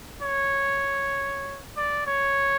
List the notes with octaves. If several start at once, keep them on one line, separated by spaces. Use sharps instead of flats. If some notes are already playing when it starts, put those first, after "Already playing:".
C#5
D5
C#5